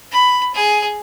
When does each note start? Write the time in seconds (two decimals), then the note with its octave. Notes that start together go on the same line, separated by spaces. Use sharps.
0.11 B5
0.54 G#4